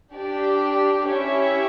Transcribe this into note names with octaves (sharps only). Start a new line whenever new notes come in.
D4 G4 D5
C#4 E4 G4 C#5 E5